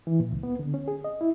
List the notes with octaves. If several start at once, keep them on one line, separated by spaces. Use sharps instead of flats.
E3
A#2
C#2
B3
D3
C#4
G#4
D#5
E4